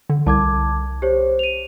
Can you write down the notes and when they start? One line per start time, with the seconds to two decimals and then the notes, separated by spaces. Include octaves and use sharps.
0.10 D3
0.26 C2 A5 D6 G#6
1.02 G4 C5 C#5
1.39 D#7 F7